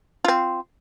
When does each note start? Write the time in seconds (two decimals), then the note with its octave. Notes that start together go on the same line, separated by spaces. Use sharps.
0.25 C4 F4